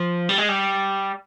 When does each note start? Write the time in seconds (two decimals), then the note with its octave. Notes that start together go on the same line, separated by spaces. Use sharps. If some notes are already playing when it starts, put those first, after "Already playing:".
Already playing: F3
0.29 G3
0.38 G#3
0.49 G3